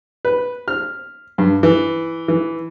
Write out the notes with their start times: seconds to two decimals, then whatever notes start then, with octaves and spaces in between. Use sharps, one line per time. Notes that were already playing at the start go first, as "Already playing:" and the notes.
0.25 B4
0.68 F6
1.38 G2
1.63 E3
2.28 E3